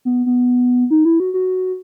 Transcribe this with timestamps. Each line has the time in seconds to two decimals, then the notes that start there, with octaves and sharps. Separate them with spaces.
0.05 B3
0.26 B3
0.91 D#4
1.05 E4
1.20 F#4
1.34 F#4